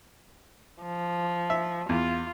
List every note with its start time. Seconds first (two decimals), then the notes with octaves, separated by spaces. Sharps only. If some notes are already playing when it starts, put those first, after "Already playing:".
0.83 F3
1.50 E5
1.89 E2 F4